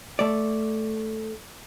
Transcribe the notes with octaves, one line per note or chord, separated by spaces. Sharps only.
A3 D5